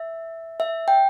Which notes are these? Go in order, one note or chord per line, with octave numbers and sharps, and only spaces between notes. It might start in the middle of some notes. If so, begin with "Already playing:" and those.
Already playing: E5
E5
G5